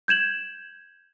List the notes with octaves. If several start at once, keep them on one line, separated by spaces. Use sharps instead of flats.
G6 G#6 E7 F#7